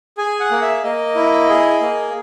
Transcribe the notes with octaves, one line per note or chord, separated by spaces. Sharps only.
G#4 G#5
F#5
A#3
E5
A#3 D#5
E4
G#4
A#3